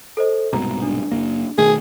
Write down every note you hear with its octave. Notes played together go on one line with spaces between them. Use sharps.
A4 C5 D#5
C2 G#2 B2 A#5
D4
F#1 E2 A#3
B2 D#3 A3 G#4